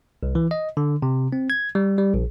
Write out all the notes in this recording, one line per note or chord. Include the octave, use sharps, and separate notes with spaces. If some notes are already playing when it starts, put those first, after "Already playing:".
C2
E3
D#5
D3
C3
C4
G#6
G3
G3
A#1